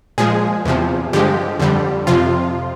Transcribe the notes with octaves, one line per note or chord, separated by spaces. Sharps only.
A#2 F3 G#3 G#4
E2 C3 F3
G2 D3 F3 G#3 G4
F2 D3 G3
F2 C3 F3 F4